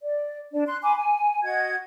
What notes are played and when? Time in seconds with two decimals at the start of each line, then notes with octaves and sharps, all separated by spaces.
0.03 D5
0.54 D4 D5
0.67 C6 F#6
0.82 G#5 B5 C6 D6
0.96 G#5
1.43 F#4 D#5 F#5 G#6